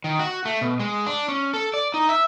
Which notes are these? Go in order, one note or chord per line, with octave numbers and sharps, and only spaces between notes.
D#3
F#4
A3
B2
G#3
D4
C#4
A4
D5
D#4
E5